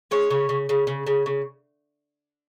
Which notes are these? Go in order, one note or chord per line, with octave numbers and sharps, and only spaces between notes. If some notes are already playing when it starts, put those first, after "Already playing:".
G#3 C#5
C#3
C#3
C#3
C#3
C#3
C#3